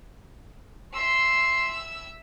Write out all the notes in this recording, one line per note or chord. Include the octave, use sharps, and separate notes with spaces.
E5 C6 E6